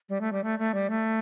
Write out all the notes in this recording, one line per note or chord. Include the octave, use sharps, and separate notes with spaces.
G3
A3
G3
A3
A3
G3
A3